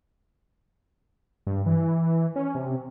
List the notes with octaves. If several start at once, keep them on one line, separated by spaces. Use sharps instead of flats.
G2
E3
C#4
C3